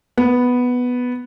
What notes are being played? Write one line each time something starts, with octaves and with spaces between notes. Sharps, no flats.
B3